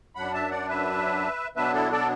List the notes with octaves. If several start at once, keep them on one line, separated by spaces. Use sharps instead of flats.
F#2 F#3 D4 F#5 B5
E5 A5
D5 F#5
B4 E5
B2 F#3 B3 D4 B4 E5
E4 A4
A4 D5